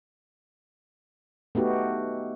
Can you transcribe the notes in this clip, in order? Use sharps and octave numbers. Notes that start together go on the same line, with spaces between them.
A3 B3 D#4 F#4 G4